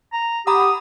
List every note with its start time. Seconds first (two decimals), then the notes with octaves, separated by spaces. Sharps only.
0.13 A#5
0.47 G4 F#5 A#5 B5 D#6